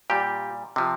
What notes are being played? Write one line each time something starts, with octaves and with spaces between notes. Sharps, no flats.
A#2 G3 G4
C3 F3